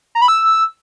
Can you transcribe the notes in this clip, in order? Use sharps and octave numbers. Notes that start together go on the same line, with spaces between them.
A#5
B5
E6